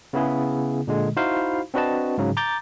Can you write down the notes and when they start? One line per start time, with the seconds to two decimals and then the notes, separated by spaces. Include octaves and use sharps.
0.13 C#3 B3 E4 G#4
0.87 A#2 D3 G#3
1.17 D#4 E4 F#4 C5 F5 B5
1.74 C4 D4 F#4 B4 D#5 A5
2.18 G#2 C#3 F#3
2.37 A#5 D6 G6 A6